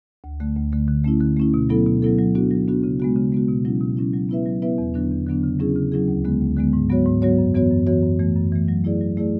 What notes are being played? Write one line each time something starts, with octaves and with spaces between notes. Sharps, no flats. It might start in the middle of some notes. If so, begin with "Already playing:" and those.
D2
D3 A3
D2
D3 A3
D3
A3 C#4 E4
D3
A3 C#4 E4
B2
F#3 B3 E4 A4
B2
F#3 B3 E4 A4
F#3
B3 D4 F#4
F#3
B3 D4 F#4
C#3
G#3 B3 F#4
C#3
G#3 B3 F#4
B2
F#3 C#4 E4
B2
F#3 C#4 E4
F#3
B3 E4 B4 E5
F#3
B3 E4 B4 E5
E2
D3 F#3 B3 D4
E2
D3 F#3 B3 D4
C#3
F#3 C#4 E4 G#4
C#3
F#3 C#4 E4 G#4
D2
D3 G#3 B3
D2
D3 G#3 B3
G#2
F#3 B3 F#4 C#5
G#2
F#3 B3 F#4 C#5
F#2
E3 B3 F#4 C#5
F#2
E3 B3 F#4 C#5
F#2
E3 A3
F#2
E3 A3
F#3
A3 E4 G#4 D5
F#3
A3 E4 G#4 D5